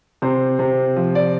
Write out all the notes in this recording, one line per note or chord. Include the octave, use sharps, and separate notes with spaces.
C3 C5
C3
F3
D5